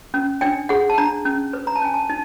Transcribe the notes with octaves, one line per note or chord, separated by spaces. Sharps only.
C#4
D4 G5
G#4 F#5
A5
D4 A#5
C#4
B4
A#5
A5
C#4 G#5
A5
D#4 A5